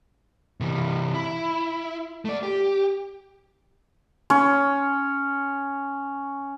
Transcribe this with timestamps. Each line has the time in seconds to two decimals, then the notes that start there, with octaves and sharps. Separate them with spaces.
0.60 C3 E3
1.14 E4
2.25 A3 D5
2.43 G4
4.30 C#4 C#5